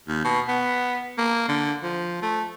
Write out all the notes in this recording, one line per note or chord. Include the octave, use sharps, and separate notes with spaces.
D#2
B2
B3
A#3
D3
F3
A3